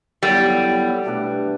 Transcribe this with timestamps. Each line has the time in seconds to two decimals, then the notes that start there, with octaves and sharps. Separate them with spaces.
0.22 F#3 G3 B3 E4 A4
1.05 B2 A3 D4 G4 B4